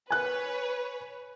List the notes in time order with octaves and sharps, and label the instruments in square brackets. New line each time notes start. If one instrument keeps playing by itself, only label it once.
[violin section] B4 C#5 [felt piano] G#5 F#6